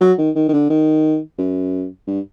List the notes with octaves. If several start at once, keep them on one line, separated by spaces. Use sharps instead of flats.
F#3
D#3
D#3
D#3
D3
D#3
F#2
G2